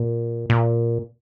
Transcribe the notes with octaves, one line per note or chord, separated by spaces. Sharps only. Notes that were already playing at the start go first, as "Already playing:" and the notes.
Already playing: A#2
A#2